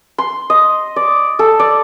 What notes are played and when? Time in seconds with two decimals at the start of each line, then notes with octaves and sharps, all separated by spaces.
0.18 C6
0.50 D#5
0.96 D5
1.39 A4
1.60 D5